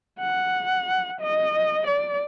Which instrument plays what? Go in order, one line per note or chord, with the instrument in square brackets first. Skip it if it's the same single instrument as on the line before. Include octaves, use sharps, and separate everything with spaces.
[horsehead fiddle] F#5
D#5
D5